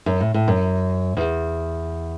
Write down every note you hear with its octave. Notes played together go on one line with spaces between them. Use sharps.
F#2
A2
A2
F#2
E2